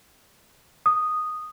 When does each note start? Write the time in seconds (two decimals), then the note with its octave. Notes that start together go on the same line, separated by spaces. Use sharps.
0.86 D#6